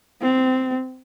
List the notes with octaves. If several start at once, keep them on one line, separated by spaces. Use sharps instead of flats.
C4